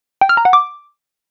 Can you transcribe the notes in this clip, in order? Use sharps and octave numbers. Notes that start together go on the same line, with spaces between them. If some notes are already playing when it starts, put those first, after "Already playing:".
G5
F6
A#5
F#5
D6